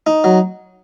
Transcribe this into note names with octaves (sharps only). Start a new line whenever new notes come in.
D#4
F#3